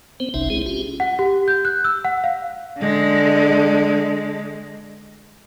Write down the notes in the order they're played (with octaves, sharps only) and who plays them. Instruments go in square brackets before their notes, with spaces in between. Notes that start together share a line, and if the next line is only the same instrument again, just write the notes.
[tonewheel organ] B3 C4 C5
F#1 C2 C3 C#4 D#4 E5
G#3 C4 E4 G#4
C#4 F4 G4
[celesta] F#5
G4
G6
F#6
E6
F#5
F5
[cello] D3 G#3